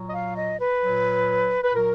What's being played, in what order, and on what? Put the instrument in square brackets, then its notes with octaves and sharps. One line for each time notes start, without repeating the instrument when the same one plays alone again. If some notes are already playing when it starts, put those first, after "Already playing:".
Already playing: [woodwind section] A#2 F#3
D#5
F5
D#5
B4
A#2 F#3
B4
A#2 F#3 A#4